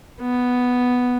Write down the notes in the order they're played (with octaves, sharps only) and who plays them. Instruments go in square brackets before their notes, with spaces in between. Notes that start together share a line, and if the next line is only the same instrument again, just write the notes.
[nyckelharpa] B3